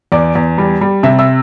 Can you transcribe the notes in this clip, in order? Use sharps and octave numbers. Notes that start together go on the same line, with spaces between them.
E2 D5 D6
E2
G3
G3
C3 E5 E6
E5 E6